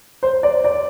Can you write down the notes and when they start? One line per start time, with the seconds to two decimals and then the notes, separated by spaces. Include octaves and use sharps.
0.23 C5
0.43 D5
0.64 D5